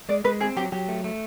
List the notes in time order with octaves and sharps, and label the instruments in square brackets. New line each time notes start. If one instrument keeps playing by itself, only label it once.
[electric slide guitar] G#3 [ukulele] D5
[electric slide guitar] G#3 [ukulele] B4
[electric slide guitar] C4 [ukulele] G#4
[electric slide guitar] F#3 [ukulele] G4
[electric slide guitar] F#3 [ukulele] G4
[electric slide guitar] A3
A3